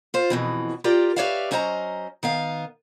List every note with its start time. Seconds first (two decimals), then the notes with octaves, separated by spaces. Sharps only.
0.14 F4 C5
0.30 F2 B2 E3
0.84 F4 G4 A#4 D5
1.16 G4 B4 C#5 D5 E5 F5
1.51 F#3 C#4 C5 D#5 F#5 A#5
2.23 D#3 B3 F5